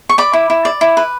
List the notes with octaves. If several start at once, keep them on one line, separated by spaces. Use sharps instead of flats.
C#6
D5 B5 D6
E4
E4
D5
E4
B4